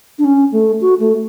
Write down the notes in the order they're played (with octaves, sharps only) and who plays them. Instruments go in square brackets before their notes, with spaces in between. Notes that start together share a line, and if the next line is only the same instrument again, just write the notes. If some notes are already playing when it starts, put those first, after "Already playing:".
[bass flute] D4
C#4
A3
F#4
A3